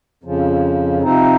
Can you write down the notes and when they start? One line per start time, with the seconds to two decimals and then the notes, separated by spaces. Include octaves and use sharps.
0.23 F2 C#3 F3
1.02 C3 F3 C4 D#4